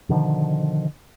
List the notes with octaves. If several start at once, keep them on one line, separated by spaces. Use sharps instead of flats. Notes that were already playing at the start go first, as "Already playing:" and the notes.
B2 D3 D#3 F3